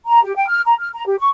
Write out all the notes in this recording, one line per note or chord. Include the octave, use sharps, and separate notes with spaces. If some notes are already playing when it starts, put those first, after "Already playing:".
A#5
G4
G5
F6
A#5
F6
A#5
G4
C#6